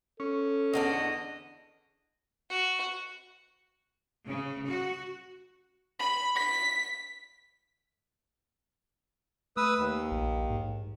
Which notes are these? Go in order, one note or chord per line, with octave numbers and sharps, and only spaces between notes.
C#4 A4
E2 D3 D4 D#5
F#4
C#3
F#4
B5
B6
A3 B4 D#6 E6
D#2
A#1
G#2